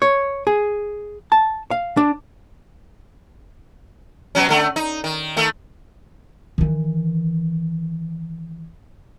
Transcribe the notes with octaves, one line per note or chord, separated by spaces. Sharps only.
C#5
G#4
A5
F5
D4
B2 F#3 C#4
D3 A3
D#4
D#3
D#3 A3
D#3 E3